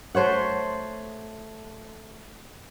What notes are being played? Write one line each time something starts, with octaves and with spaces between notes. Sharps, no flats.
A3 C5 C#5 F#5